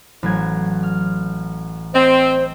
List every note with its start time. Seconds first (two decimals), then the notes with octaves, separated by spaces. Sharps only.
0.23 A1 F#3 G#6
0.83 F6
1.94 C4 C5 D#5